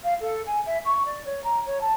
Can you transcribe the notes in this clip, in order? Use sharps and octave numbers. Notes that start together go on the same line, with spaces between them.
F5
A4
G#5
E5
C#6
D5
C#5
A#5
C#5
A5